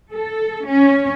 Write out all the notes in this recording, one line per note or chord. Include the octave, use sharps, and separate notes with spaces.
A4
C#4